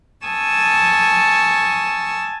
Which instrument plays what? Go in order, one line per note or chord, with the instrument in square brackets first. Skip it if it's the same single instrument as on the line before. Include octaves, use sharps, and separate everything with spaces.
[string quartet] G#5 A5 C#6 D#6 E6